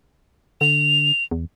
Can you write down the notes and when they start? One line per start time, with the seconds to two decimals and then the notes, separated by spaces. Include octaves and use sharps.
0.61 D3 F7
1.31 E2